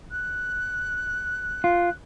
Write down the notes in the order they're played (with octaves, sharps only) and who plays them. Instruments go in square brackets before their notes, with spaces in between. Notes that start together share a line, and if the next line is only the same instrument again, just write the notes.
[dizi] F#6
[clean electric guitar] F4